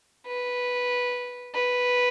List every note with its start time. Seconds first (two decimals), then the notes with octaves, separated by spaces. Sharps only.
0.27 B4
1.55 B4